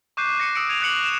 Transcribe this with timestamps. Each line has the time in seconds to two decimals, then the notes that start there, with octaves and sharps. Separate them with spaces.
0.17 C#6 D6 F#6 G6 C7 D#7
0.40 A#6 C#7 D#7
0.55 D#6 E6 C#7 D7
0.69 G#6 D#7 F7
0.81 D6 F#6 A#6 C#7 F#7
1.03 E7